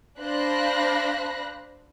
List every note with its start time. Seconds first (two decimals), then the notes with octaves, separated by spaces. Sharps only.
0.19 D4 C5 F5 B5 F#6 A#6